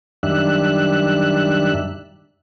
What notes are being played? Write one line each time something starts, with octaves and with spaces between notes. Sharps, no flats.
F#2 D#3 G3 D4 E5 F#6